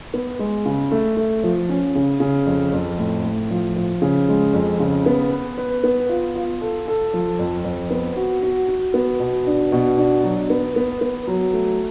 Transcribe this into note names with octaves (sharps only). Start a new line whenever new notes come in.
B3
G#3
C#3
A3
A3
F3
C#4
C#3
C#3
F2
F2
A2
A2
F3
F3
C#3
G#3
F2
C#3
B3
B4
B4
B3
F4
F4
A4
A4
F3
F2
F2
B3
F#4
F#4
F#4
B3
B2
D4
B2
D4
F#3
B3
B3
B3
F#3
A3